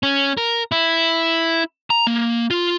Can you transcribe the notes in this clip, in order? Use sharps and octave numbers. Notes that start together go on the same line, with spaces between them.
C#4
A#4
E4
A#5
A#3
F4